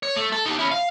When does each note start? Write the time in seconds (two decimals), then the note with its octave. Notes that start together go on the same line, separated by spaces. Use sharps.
0.03 C#5
0.16 A3
0.32 A4
0.46 D#4 G4
0.59 C#4 E4
0.71 F5